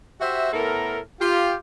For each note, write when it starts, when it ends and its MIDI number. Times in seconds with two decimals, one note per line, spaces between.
0.20 0.52 66
0.20 0.52 67
0.20 0.52 72
0.20 0.52 76
0.53 0.99 45
0.53 0.99 59
0.53 0.99 64
0.53 0.99 69
0.53 0.99 70
1.20 1.54 65
1.20 1.54 67